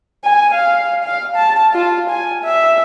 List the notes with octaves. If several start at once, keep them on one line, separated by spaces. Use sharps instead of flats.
G#5
F5
F5
A5
F4
G#5
E5